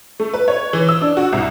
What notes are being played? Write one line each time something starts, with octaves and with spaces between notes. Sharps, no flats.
A3
B4
C#5
E3
E6
D4
F#4
C2